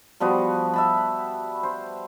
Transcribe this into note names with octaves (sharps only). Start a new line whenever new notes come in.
F3 G3 B3 F#4
E5 A5 B5
C5